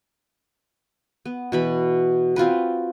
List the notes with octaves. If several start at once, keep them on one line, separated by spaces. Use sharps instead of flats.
B3
B2 E3 B5
C4 F4 F#4 B4